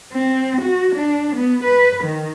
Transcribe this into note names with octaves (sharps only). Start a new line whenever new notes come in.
C4
F#4
D4
B3
B4
D#3